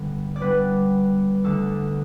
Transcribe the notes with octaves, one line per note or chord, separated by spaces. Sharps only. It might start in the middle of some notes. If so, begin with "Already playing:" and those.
Already playing: G2 D3 B3
D5
G2 G3 B3 B4
D2 D3 A3 A4